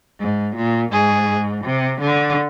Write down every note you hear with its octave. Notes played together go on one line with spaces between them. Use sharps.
G#2
A#2
G#2 G#4
C3
D3